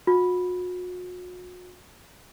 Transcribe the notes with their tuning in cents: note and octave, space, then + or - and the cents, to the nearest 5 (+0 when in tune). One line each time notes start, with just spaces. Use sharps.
F#4 -40